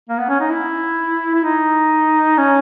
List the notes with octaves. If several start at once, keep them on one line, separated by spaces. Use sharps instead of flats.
A#3
B3
C#4
D#4
E4
E4
D#4
C#4